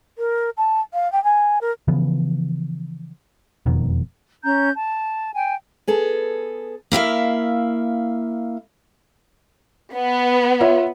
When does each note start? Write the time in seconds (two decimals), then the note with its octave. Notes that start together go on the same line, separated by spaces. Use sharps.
0.18 A#4
0.57 A5
0.93 F5
1.12 G5
1.24 G#5
1.61 A#4
1.88 C#3 E3 F3 B3
3.66 E1 F2 B2 D#3
4.44 C#4 A#5 G6
4.75 A5
5.35 G5 G#5
5.88 B3 G#4 A4
6.92 A#3 E4 E5 F5
9.94 B3
10.61 F4 C#5 E5